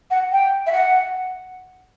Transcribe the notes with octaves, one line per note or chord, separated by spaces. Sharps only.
F#5
G5
E5
F#5